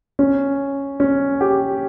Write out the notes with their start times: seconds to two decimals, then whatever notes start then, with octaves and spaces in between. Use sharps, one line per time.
0.19 C#4
1.00 C#4
1.41 G4